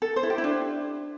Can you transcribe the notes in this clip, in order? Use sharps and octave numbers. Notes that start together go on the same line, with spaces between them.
A4
C5
E4
G4
E4
D4